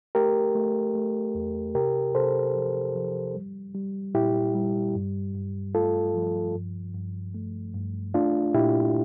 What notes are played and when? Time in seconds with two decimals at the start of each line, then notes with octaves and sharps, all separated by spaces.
0.15 A3 G4 A#4
0.55 A3
0.95 A3
1.35 E2
1.75 C3 G4 A#4
2.15 C3 A4 C5
2.55 F3
2.95 F3
3.35 G3
3.75 G3
4.15 A#2 E4 G4
4.55 G3
4.95 G2
5.35 G2
5.75 A3 F4 A4
6.15 F3
6.55 G2
6.94 G2
7.35 A3
7.74 G2
8.14 A3 D4 F4
8.54 A#2 E4 G4